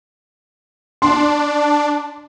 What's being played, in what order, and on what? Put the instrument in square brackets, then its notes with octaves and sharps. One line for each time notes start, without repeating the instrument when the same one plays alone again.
[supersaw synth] D4 [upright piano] C6